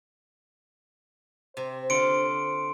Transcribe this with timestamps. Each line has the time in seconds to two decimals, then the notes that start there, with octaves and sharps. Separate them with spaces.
1.57 C3 C5
1.90 D3 F4 C6 C#7 D7